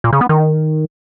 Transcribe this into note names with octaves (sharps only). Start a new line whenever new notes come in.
A#2
C#3
B3
D#3